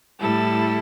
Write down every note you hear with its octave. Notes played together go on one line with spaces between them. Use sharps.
A2 G3 E4 A4